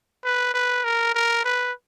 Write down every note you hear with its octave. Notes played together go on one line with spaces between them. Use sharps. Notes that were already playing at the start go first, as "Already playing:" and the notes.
B4
B4
A#4
A#4
B4